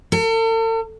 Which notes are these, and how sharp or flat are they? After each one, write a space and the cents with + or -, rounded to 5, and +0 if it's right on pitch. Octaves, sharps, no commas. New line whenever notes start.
A4 +45